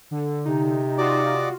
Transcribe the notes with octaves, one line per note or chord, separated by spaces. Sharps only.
D3
C3 D#4
F4 F#4 D5 D#5 D6